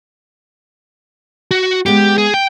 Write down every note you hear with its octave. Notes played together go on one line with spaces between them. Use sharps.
F#4
G#3 B3 G4
G#4
G5